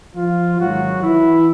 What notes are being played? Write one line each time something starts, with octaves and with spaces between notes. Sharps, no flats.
F3 F4
G#1 G#2 D#3 F#3 F#4
E3 E4